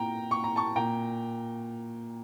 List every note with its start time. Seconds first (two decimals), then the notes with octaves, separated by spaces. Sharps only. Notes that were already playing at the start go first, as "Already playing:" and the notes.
Already playing: A#2 G5 A#5
0.31 C#6
0.44 A#5
0.56 A5 C#6
0.76 A#2 G5 A#5